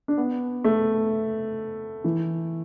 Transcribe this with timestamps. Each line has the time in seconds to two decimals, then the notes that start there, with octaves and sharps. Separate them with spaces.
0.08 D4
0.18 B3
0.64 A3
2.04 E3